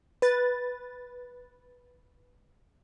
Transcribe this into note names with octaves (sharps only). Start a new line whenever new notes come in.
B4 A6